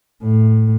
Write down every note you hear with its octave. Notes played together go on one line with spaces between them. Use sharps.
A2